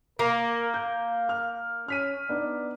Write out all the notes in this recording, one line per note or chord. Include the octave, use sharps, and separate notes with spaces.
A#3 A#4
F5 G6
F6
C#4 F6 B6 D#7
B3 D4 D#4 D5